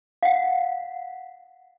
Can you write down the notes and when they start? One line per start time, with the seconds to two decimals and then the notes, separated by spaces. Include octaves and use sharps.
0.23 F5 F#5